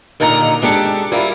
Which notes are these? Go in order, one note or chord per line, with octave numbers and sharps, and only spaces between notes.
D#2 A#2 D3 D#4 G#5 A#5
G#3 D4 G4 A4
G3 E4 F4 A#4